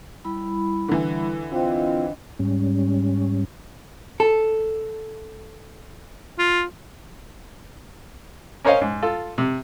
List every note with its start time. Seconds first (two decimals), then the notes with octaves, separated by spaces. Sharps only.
0.25 G3 E4 B5
0.88 D3 E3
1.52 C4 D4 F4 D#5
2.39 G#2 G3 C#4
4.20 A4
6.39 F4
8.65 C#4 A#4 C5 C#5 D#5 F5
8.82 G#2
9.02 F4 A4
9.38 C3